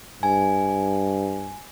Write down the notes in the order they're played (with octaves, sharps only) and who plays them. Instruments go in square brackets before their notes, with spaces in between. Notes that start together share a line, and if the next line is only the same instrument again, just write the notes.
[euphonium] G2 [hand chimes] G#5